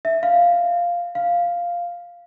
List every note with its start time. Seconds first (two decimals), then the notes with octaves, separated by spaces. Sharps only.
0.05 E5
0.23 F5
1.15 F5